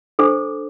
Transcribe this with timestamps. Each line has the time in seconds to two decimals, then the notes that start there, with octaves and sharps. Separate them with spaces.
0.19 D4 A4 C5 D6